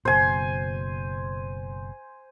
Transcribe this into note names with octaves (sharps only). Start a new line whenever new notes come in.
F#1 B2 C5 G#5